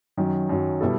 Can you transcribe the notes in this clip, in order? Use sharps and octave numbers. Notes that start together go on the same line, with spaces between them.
F#2 D#3 F#3
F#2 D#3 F#3
B2 G3 B3 E4 A4